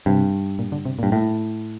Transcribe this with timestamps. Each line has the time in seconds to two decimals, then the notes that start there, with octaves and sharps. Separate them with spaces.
0.06 G2 C3
0.59 A#2
0.72 D3
0.85 C3
0.99 G2 A#2
1.12 A2